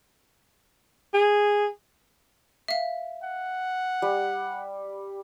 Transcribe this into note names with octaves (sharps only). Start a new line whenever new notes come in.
G#4
E5 F5
F#5
G3